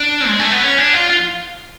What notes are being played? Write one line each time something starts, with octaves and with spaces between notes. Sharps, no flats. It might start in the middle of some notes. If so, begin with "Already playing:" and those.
Already playing: D4
G#3
A3
B3
C#4
D4
F4
F4